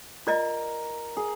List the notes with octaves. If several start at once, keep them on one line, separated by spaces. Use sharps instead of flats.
F4 A#4 D5 D#5
G#4